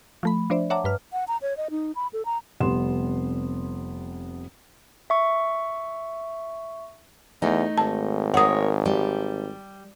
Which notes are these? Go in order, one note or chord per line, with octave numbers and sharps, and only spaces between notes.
F3 A3 B5
F3 D4 C5 D5 E5
C#5 E5 F#5 A5 A#5 D6
G2 B4 F6
F#5
A#5
C#5
D#5
D#4
B5
A4
A#5
F1 C3 G3 B3 C6 E7
E5 C#6
E2 A3 D#4
G#1 A5
A#4 C#5 F#5 D#6
G3